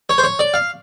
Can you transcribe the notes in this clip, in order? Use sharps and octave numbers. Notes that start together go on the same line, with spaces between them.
C#5
C5
C#5
D5
F5